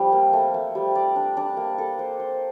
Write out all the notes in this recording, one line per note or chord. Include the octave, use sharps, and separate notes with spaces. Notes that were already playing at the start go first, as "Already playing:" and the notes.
Already playing: F3 G3 C4
A#3
A3
A3
G3
D5
D4
D4
A#3
A4
C5
C5